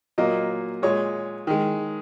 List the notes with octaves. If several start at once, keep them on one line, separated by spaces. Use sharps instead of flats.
A#2 F#3 A#3 D#5
A#2 G#3 C#5
D#3 G#3